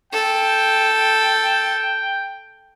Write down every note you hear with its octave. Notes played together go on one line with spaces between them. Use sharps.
A4 G5